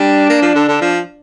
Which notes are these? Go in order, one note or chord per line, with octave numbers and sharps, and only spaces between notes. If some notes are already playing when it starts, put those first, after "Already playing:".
Already playing: G3 D4
A#3
F3
D3
D3
F3